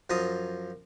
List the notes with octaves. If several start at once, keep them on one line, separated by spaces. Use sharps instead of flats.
F#2 F3 F4 A#5 D#6